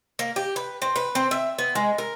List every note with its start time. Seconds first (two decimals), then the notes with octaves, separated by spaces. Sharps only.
0.19 A#3
0.36 G4
0.56 B4
0.82 C4
0.96 B4
1.15 C4
1.31 E5
1.59 B3
1.75 G#3
1.98 A#4